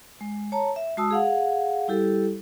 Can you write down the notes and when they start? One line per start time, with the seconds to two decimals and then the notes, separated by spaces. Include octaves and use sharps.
0.21 G#3
0.52 C#5 A5 A#5
0.76 E5
0.97 G#3 F#4 A5 D#6 E6
1.11 G#4 F5 F#5
1.88 G3 E4 G4 A4